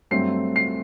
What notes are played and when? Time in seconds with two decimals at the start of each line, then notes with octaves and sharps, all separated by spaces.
0.11 G2 F#3 A3 C4 C7
0.56 C7